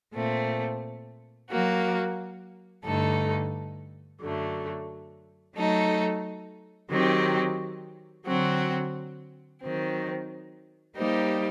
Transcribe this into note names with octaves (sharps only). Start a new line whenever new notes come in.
A#2 A3 C4
F#3 A#3 F#4
G2 D3 A3 D#4 A4
F#2 D3 F#3 A3
F#3 A3 D#4 A4
D#3 F#3 C4 G4
D3 F#3 C4 F#4
D#3 F#3 C4
G3 A#3 D#4 G4 C5